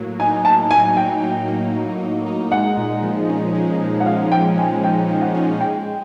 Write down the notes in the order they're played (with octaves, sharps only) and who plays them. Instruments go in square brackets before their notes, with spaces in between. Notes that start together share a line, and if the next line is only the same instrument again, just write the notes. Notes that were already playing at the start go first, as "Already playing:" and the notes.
Already playing: [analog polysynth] A2 F#3 A#3
[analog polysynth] D#4 [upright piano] G#5
[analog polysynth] A#3 [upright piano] A5
[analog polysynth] A2 [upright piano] G#5
[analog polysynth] F#3 [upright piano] G5
[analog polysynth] D#4
A#3
A2
F#3
D#4
[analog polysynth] G#3 [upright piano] F#5
[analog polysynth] A#2
F3
C#4
G#3
A#2
[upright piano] F#5
[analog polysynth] F3 [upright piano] F5
[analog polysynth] C#4 [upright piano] G5
[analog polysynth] G#3 [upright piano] G#5
[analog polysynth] A#2 [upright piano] G5
[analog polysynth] F3
[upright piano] F#5
[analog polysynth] C#4
[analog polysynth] G#3 [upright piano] G5